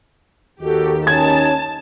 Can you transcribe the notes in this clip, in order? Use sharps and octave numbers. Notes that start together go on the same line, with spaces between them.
D#2 D#3 F#4 G4 A4
C#4 D#4 C#5 A5 G#6